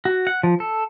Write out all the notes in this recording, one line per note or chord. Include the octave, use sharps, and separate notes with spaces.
F#4
F#5
F3
A4